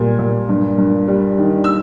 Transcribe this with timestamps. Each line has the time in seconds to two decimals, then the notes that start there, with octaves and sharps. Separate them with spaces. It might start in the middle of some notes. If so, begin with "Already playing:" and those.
Already playing: A#2 G3
0.19 A#2
0.49 G2
0.78 G2
1.08 G3
1.38 D#3
1.64 E6